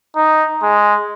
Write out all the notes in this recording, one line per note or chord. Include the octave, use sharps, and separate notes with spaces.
D#4
G#3